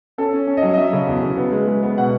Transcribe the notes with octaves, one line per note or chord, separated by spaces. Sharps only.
C#4 A4
C#4
C#4
D#5
F#3
D#5
F#3 E5
C#3
E2
C#3
B3
G#3
G#3
B3
B2 F#5